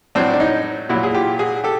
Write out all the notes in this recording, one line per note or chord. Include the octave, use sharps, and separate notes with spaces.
A2 F#3 C4 D4
D4
C#4 D#4
A#2 F#3 E4 F#4
G#4
F4 G4
F#4 G#4
G4 A4